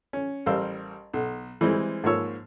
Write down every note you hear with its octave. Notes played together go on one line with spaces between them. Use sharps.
C#4
A1 G3 A#4 C5 F5 E6
B1
E3 G3 G#3 C4
G#2 F3 A#3 C#5 E6